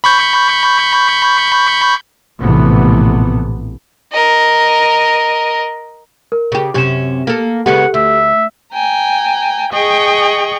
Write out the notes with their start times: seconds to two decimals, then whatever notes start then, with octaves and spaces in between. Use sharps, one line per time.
0.04 B5 C#6 G6
2.39 A#1 A2 C3 E3 A3 B3
4.12 A#4 D#5
6.32 A#4
6.52 C#3 G4
6.74 F#2 C3 C#4 G4 E7
7.27 A#3 A4
7.66 C#3 G#3 B3 G4 A4 F#5
7.94 D2 E5
8.73 G5 G#5 A#5
9.71 G#4 D#5 G5 C#6